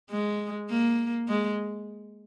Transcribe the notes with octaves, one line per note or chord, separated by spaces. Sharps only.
G#3
A#3
G#3